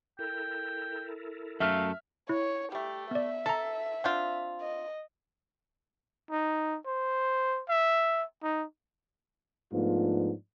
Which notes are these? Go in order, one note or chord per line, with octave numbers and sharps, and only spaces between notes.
E4 A4 A#4 G5
F#2 A3 E5 F5 F6
E4 C#5
G3 A3 G4
B3 D5 E5
A4 A5 A#5
C4 D4 F4 F#5 G6
D#5
D#4
C5
E5
D#4
G#2 F3 A3 B3 D4 F4